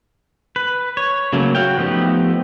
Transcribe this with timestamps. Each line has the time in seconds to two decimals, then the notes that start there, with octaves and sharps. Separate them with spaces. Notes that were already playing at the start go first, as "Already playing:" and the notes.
0.56 B4
0.97 C#5
1.33 C#3 F#3 A3 A#3
1.55 F#4 C#5 F5 G5
1.78 F3 A3 B3 D#4 G4